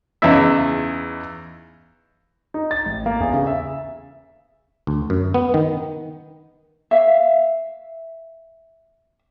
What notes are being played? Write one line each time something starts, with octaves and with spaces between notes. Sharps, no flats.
E2 C#3 C#4 D#4 E4 E5
D#4
A6
A1
A#3
E2
C#3
E5
D2
F#2
B3
D#3
E5 F5